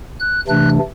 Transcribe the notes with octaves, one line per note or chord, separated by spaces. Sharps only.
F#6
C3 E3 A3 D4 F#6